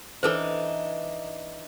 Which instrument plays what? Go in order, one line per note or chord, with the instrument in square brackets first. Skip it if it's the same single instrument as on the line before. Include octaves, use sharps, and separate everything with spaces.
[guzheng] E3 D4 D#4 [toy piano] A4 B4 C5